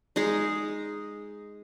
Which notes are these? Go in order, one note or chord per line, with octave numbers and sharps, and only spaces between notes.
G#3 D#4